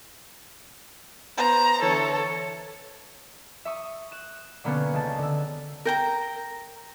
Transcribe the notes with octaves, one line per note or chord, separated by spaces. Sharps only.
B3 C5 A#5
D3 E3 A4 C#5
E5 C#6 D#6
F#6 E7
B2 D3 A#3 B3 C#4 D4
C#2 A5
D3 E6
A#4 G5 A#5